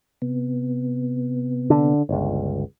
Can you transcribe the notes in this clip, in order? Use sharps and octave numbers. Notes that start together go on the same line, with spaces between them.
C3 B3
D3
G1 C#2